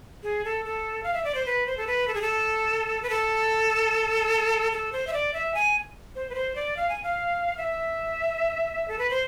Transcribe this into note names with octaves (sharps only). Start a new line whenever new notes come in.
G#4
A4
A4
F5
E5
D5
C5
B4
C5
A4
B4
A4
G#4
A4
B4
A4
A4
C5
E5
D5
E5
G#5
C5
B4
C5
D5
F5
G#5
F5
E5
A4
B4
C5